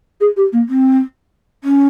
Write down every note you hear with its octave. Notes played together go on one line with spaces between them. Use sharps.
G#4
G4
A#3
C4
C#4